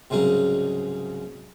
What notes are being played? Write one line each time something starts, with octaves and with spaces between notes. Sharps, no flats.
C2 G#2 C#3 F#3 D#4